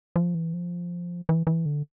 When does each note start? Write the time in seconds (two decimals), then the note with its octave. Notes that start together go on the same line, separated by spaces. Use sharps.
0.16 F3
0.35 E3
0.54 F3
1.29 E3
1.47 E3
1.66 D3